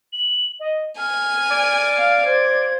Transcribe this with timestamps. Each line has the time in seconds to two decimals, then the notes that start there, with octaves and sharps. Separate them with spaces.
0.13 F#7
0.60 D#5
0.98 G#5 F6
1.51 D5
1.97 F5
2.25 C5 G#6